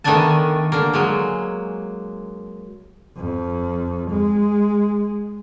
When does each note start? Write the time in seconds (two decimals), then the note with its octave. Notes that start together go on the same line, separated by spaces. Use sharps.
0.04 D#3 A3 B3 D4 G#5 A5
0.72 D3 A#3
0.94 F#3 G#3
3.17 F2
4.11 G#3